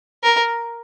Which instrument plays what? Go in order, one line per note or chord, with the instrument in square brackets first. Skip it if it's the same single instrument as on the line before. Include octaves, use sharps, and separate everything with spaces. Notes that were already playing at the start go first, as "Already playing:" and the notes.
[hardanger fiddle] A#4